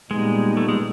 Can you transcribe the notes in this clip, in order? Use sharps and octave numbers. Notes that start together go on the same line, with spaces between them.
A#2 G3 G#3 B3 D#4
A3
G#3